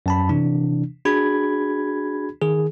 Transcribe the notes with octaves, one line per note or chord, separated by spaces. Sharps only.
F#2 A5 B5
C3 E3 D4
D4 F#4 G#4 B5 G#6
D#3 G#4